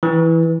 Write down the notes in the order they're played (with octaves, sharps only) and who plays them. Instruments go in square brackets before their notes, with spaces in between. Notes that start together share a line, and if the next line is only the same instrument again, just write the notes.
[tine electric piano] E3